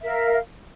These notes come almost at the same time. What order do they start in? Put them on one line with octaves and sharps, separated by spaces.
E5 A#4 F5